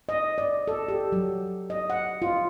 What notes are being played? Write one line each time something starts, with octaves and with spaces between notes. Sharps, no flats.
D#5
D5
A4
G4
F#3
D#5
F#5
F4